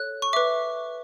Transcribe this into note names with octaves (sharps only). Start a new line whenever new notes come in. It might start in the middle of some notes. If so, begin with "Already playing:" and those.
Already playing: A4 C#5 F#6
C#6
B4 E5 D6